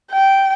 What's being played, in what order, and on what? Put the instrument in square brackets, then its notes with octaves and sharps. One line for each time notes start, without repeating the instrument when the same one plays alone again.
[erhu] G5